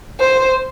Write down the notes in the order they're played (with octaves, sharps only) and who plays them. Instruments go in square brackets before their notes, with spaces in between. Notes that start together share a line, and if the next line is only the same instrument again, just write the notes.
[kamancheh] C5